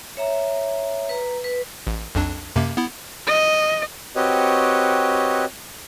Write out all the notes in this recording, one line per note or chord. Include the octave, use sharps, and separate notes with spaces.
C#5 E5 A#5
B4 A#5
B4
A1
B1 F2 D4
F#2 C3 A#3
B3 E4
D#5
C4 F#4 G4 B4 C#5 D#5